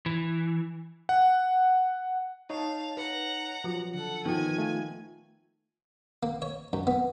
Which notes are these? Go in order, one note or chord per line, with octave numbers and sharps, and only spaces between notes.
E3
F#5
D#4 C#5 F5 A5
B4 F#5 A#5
F3 F#3
D3 A4 F#5
D#3 F3 B3 G#5
A3 F4
A#3
C#5
F#2
B3